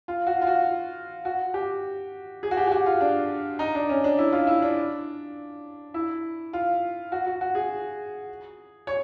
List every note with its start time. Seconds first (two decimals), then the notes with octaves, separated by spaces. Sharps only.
0.08 F4
0.27 F#4
0.42 F4
0.47 F#4
1.25 F#4
1.54 G4
2.43 G#4
2.51 F#4
2.57 G4
2.67 G4
2.72 F#4
2.86 F4
3.01 D4
3.59 D#4
3.75 D4
3.89 C#4
4.04 D4
4.18 E4
4.32 F4
4.47 E4
4.62 D4
5.94 E4
6.53 F4
7.12 F#4
7.26 F#4
7.41 F#4
7.55 G#4
8.87 C#5